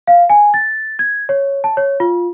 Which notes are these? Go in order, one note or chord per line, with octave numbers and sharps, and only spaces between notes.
F5
G#5
A6
G#6
C#5
A5
C#5
F4